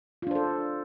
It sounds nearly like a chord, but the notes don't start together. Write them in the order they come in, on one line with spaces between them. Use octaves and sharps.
F4 D4 C5 A4